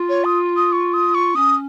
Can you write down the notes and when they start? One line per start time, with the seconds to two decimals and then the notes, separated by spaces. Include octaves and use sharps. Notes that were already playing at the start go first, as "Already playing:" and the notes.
Already playing: F4
0.09 C#5
0.25 D#6
0.57 D#6
0.72 C#6
0.94 D#6
1.15 C#6
1.35 C#4 D#6